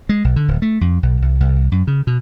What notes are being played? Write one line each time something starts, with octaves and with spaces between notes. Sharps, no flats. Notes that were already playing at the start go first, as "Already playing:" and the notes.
G#3
B1
D3
D1
A3
F2
B1
C2
C2
F#2
C#3
B2